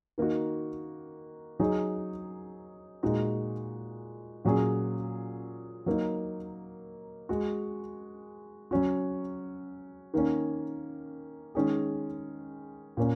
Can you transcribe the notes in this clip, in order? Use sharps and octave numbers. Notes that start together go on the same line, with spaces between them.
D#3 A#3 D#4 F#4
F#3 D#4 G#4
A#2 G#3 D#4 F#4
A#2 F#3 C#4 G#4
F#3 A#3 D#4
G#3 F#4
F#3 C#4 F#4
D#3 A#3 C#4
D#3 G#3 C#4 G#4
A#2 A#3 C#4